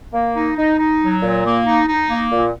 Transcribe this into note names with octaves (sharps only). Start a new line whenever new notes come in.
A#3
D#4
D#4
D#4
F#3
A#2
A#3
D#4
D#4
A#3
A#2